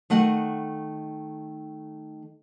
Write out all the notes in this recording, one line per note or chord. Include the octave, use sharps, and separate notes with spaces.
D#3 A3 D#5 F#5